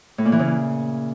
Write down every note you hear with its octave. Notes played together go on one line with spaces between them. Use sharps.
A2
A#2
E3
C#3
A#2